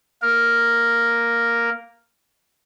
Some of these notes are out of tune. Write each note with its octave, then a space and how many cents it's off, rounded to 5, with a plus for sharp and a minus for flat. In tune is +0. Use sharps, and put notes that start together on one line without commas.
A#3 +0 A#4 +0